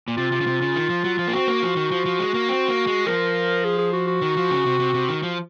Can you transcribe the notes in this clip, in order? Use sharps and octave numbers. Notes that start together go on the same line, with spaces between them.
A#2
C3 F4
C3
C#3
C3
C#3
D#3
F3
F#3
F3
A#3
C4 F#4
A#3
F3
D#3
F3
F3
G#3
A#3
C4
A#3
G#3
F3 A#4
G#4
G#4
F#4
F#4
D#3
F3
C#3
C3
C3
C3
D#3
F3